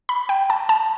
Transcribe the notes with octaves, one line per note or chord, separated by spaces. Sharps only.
B5
G5
A5
A5